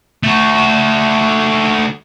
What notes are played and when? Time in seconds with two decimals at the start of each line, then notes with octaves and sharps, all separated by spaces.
0.23 A3 F#4